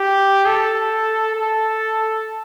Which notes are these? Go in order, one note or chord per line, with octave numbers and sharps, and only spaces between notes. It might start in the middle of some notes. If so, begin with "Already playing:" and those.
Already playing: G4
A4
A4